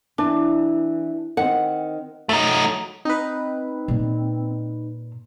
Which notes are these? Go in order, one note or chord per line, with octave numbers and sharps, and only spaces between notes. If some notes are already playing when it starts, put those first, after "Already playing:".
E3 D4
D#3 C4 F#5
F#3 A3 D#4
C4 D#4 B4
A#2